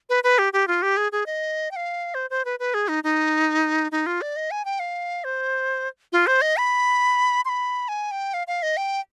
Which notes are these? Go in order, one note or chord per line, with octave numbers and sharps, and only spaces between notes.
B4
B4
G4
G4
F4
G4
G#4
G#4
D#5
G5
F5
C5
C5
B4
B4
G#4
D#4
D#4
D#4
F4
D5
D#5
G#5
G5
F5
C5
F4
C5
D#5
B5
C6
B5
G#5
G5
F5
F5
D#5
G5